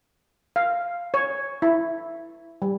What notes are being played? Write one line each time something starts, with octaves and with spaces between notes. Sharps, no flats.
F5
C#5
E4
G3